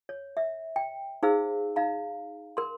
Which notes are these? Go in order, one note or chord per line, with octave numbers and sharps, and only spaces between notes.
C#5
E5
G5
D#4 G#4 C5 F5 E6
D#4 F5 A#5
A#4 C6